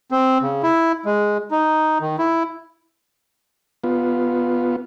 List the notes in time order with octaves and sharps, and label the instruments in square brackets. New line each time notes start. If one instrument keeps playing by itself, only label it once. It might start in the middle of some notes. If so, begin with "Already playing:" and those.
[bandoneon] C4
C#3
E4
G#3
D#4
D#3
E4
[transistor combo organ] B3 F4